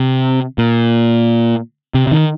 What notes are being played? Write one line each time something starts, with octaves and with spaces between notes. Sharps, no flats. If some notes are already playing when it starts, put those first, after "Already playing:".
Already playing: C3
A#2
C3
C3
D#3